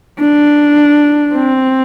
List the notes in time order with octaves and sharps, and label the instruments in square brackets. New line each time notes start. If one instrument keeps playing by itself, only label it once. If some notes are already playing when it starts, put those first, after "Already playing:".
[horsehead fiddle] D4
C4